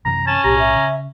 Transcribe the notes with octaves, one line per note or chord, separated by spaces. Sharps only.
F#2 C3 E3 A#5
C#4 A5
B1 A2 G4 A#5
E5
C#3